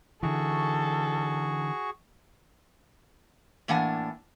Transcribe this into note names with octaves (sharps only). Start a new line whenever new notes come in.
D3 E3 F#4 G#4 A4 C#6
A2 E3 A#3 D4 F#5 G#5